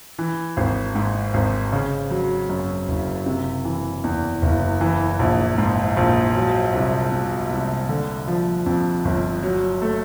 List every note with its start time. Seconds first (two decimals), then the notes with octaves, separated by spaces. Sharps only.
0.19 E3
0.57 G#1
0.95 G#2
1.34 G#1
1.72 C#3
2.11 F#3
2.50 F#2
2.88 F#1
3.26 C3
3.65 E3
4.04 E2
4.42 F#1
4.81 E3
5.19 A#1
5.58 G#2
5.97 A#1
6.35 F#3
6.74 C2
7.12 B2
7.50 C2
7.89 D3
8.28 F3
8.66 F2
9.05 G1
9.43 F#3
9.82 A3